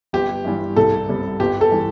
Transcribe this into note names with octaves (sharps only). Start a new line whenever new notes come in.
G1 G4
G2 E3 G3
C2 A4
C3 G3
G1 G4
A4
E3 G3